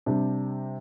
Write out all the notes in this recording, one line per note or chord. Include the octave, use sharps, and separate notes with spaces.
C3 G3 D4 G4